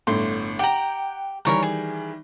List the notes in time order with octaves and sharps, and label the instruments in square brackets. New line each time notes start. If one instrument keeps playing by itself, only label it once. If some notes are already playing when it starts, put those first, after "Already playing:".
[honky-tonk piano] G1 A2 D3 [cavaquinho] C6
[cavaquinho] G4 A#5 [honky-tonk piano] F#5 G5 F#7
[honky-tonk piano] D#3 E3 G3 [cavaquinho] A#4 C#5 A#5
[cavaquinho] G#4